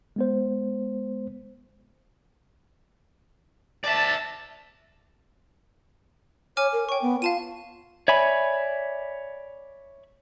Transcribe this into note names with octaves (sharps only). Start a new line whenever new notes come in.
G#3 B3 C5
D5 E5 A5
C#5 G#5 D6 F6
A#4
C#5 G5 C#6
B3
F4 F5 A5 D#7
C#5 D5 E5 G#5 B5